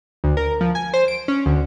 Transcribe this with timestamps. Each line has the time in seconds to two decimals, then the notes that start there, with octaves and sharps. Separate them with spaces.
0.24 D2
0.37 A#4
0.61 F3
0.75 G#5
0.94 C5
1.08 D7
1.28 C#4
1.46 D2